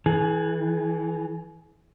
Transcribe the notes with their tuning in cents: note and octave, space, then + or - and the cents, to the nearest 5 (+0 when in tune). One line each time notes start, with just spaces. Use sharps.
E3 -20 G#4 +35